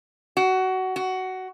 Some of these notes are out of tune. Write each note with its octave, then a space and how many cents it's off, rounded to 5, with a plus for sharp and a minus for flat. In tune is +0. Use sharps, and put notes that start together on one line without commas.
F#4 +20
F#4 +15